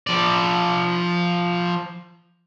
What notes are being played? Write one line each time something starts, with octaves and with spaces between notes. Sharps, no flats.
F3 D5